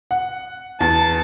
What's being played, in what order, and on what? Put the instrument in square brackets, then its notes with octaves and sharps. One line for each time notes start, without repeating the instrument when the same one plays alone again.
[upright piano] F#5
[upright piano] E2 [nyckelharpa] A5